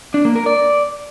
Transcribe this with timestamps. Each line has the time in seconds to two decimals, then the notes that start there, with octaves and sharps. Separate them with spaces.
0.14 D4
0.25 A#3
0.36 A#4
0.46 D5